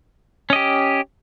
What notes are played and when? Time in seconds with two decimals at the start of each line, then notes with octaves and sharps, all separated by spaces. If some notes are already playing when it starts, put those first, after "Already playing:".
0.50 C#4
0.53 D#5
0.56 G4